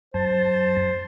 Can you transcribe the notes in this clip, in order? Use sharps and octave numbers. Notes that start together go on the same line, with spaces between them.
F#2 C5 A5